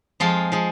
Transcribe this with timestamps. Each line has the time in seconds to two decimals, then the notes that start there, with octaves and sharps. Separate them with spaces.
0.20 F2 F3 G#3 F4
0.52 F3 G#3